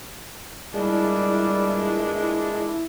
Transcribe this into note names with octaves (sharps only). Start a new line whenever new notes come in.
E2 A#2 G3 G#3 D4 E4